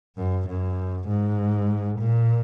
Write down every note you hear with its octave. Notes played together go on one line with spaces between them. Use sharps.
F#2
F#2
G#2
A#2